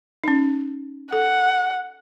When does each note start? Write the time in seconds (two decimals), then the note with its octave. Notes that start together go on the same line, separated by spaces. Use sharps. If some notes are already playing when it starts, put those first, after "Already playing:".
0.24 C#4 D#4
1.13 A4 F#5